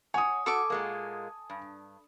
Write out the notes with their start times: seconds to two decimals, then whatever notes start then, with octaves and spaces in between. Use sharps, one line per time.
0.14 C#5 F#5 G#5 D#6
0.46 F#4 A4 C#6 D6
0.70 A#2 G#3 A#3
1.50 G2